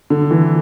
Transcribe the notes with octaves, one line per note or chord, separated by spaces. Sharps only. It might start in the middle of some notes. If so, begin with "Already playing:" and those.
D3
E3